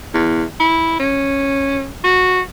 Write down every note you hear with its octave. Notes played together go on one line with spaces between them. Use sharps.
E2
E4
C#4
F#4